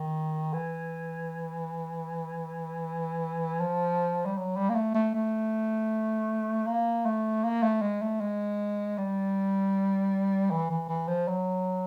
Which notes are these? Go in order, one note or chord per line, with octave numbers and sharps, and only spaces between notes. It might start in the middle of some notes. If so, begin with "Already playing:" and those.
Already playing: D#3
E3
F3
G3
F#3
G3
A#3
A3
A3
A3
A#3
A3
A#3
A3
G#3
A3
G#3
G3
E3
E3
E3
F3
F#3